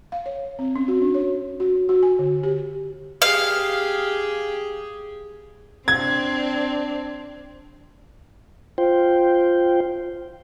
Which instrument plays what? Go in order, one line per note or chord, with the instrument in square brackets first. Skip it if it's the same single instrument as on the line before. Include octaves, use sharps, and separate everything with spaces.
[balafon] F5
C#5
C4
C#4
F#4
D4
C#5
F#4
F#4
G#5
D3
G4
[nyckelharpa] G4 G#4 [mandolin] F5
[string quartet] C4 D4 [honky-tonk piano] G#6
[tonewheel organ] F4 C5 G5